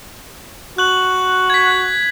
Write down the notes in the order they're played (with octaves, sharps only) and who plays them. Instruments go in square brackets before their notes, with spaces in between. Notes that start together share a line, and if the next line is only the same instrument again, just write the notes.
[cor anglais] F#4 [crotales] F#6 F#7
[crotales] G#6 B6